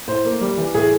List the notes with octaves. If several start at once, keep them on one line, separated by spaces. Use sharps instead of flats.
A2 C5
A#3
G3
E3
A2 G#4